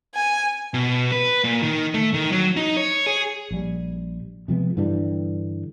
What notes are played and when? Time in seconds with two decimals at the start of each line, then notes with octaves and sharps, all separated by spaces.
0.15 G#5
0.74 B2
1.12 B4
1.44 A#2
1.62 D#3
1.94 A3
2.14 D#3
2.32 F#3
2.57 D#4
2.77 C#5
3.06 G#4
3.51 A#1 G3
4.48 C3 F3 G#3 B3
4.77 G2 D3 E3 G3